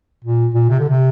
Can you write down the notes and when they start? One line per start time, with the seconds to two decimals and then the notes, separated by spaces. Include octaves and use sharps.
0.25 A#2
0.54 A#2
0.70 C3
0.79 D3
0.89 C3